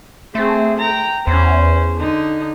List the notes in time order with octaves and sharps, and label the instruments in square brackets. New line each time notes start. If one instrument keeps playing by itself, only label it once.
[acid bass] A3 [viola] C4 G#4
[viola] G5 A#5
[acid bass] E2 [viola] C#4 C5
[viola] D3 D#4